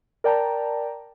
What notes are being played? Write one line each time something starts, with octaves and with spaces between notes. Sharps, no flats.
A#4 D5 G5 A5 A#5